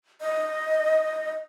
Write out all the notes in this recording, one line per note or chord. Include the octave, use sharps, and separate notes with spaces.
D#5